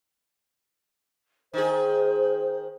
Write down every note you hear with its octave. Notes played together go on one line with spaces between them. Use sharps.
D#3 G#4 C5